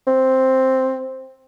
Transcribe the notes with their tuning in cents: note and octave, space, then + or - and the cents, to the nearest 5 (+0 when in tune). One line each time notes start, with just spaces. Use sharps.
C4 +5